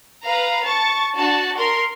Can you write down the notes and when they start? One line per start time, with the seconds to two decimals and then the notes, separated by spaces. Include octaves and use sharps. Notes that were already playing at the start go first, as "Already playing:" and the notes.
0.23 B4 F5 A#5
0.66 A5 C#6 A6
1.17 D4 F#4 A5
1.58 A#4 C6 C7